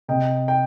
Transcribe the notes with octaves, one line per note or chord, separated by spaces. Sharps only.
C3 D#5 G5
G5